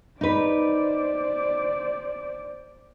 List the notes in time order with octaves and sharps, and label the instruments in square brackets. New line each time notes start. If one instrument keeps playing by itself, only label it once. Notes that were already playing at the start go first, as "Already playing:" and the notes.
[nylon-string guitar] D#4 B4 [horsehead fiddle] C5 D5